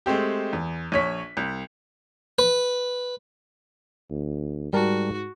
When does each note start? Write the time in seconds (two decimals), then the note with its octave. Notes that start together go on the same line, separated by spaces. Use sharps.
0.06 G#3 A3 C4 G4
0.53 E2
0.92 A#1 C#5 B6
1.37 C2
2.39 B4
4.10 D2
4.73 G#2 G3 F#4 A#4 A5